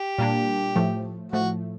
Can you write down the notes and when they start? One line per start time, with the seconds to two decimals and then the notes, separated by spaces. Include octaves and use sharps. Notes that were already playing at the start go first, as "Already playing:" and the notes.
Already playing: G4
0.18 A#2 G3 A#3 D4
0.76 A2 F3 A3
1.32 A2 F3 A3 F#4